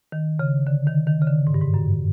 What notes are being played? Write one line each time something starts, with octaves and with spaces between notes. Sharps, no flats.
D#3
C#3
D3
D#3
D#3
C#3
D3
G#2
G2
G#2
F#2